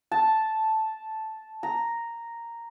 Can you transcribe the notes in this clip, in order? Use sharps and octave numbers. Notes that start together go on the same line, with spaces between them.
A5
A#5